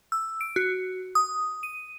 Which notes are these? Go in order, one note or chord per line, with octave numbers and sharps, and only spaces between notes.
E6
D7
F#4
D#6
D#7